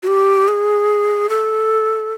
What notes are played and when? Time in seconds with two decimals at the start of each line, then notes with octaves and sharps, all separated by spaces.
0.03 F#4
0.07 G4
0.48 G#4
1.29 A4